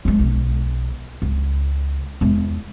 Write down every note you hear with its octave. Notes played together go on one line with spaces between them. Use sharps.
F3 G#3
B1
C#2
E2 G#3